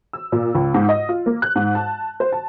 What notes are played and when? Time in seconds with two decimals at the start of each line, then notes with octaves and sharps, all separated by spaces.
0.13 E6
0.32 A#2
0.55 C#2
0.74 G#2
0.89 D#5
1.09 F4
1.26 A#3
1.42 F#6
1.56 G#2
1.75 A5
2.20 C5
2.32 A5